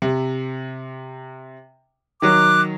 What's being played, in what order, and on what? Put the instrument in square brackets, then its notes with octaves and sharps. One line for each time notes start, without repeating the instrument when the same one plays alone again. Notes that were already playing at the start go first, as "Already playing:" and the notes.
[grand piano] C3
[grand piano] D#3 F#3 [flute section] D6 F#6